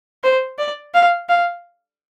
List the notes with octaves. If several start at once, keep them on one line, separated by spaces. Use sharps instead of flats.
C5
D5
F5
F5